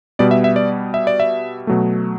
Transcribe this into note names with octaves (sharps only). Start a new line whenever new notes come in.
B2 G3 B3 D5
E5
E5
D5
E5
D5
E5
B2 F#3 A3